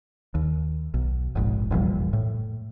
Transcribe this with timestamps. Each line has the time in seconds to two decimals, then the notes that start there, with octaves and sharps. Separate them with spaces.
0.35 D#2
0.94 B1
1.35 F1 A#1 G#2
1.71 F1 A#1 E2 G3
2.13 A2